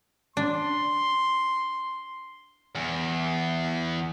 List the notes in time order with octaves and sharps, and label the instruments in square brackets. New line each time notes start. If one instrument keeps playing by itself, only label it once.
[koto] D4 [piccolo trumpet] C6
[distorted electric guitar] E2